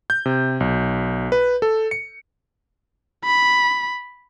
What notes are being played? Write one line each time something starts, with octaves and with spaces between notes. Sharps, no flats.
G6
C3
B1
B4
A4
C#7
B5